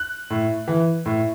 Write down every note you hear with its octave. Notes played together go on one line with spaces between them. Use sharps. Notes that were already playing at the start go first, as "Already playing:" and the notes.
Already playing: F#6
A2
E3
A2